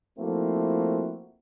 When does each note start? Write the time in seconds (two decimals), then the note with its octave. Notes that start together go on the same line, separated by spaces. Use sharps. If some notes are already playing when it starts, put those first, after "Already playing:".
0.19 F3 A3 A#3 C4 E4 F#4